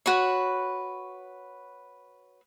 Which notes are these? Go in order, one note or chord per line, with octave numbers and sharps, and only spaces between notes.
F#4 B4 C#5